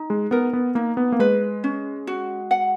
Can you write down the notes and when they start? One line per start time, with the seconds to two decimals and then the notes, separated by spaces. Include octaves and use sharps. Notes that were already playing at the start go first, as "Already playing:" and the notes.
Already playing: D#4
0.10 G#3
0.31 B3 A#4
0.53 B3
0.75 A#3 D#4
0.97 B3
1.12 A#3
1.19 G#3 B4
1.64 C#4
2.07 F#4
2.51 F#5